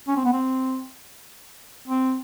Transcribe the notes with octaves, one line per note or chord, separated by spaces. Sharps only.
C#4
C4
B3
C4
C4